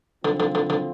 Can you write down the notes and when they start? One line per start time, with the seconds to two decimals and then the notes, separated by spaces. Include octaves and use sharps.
0.25 A2 D3 F3 C4 F4
0.40 D3
0.55 D3
0.70 D3